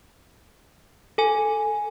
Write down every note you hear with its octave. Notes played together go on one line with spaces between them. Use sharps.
A4 G#5